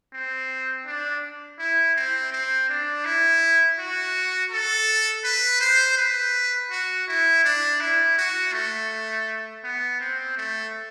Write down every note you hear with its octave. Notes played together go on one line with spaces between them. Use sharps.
C4
D4
E4
C4
C4
D4
E4
F#4
A4
B4
C5
B4
F#4
E4
D4
E4
F#4
A3
B3
C4
A3